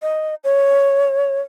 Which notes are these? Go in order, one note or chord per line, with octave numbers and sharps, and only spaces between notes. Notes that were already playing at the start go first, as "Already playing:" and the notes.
D#5
C#5